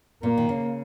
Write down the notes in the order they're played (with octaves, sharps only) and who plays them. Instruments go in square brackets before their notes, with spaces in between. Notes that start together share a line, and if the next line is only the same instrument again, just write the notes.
[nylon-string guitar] A#2 [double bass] A#3
[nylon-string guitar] D#3
C#3